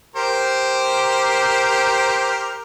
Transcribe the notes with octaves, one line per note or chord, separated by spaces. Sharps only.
G4 A#4 C5